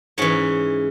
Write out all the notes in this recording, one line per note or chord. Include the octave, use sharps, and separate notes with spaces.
G#2 E3 C#4 C#5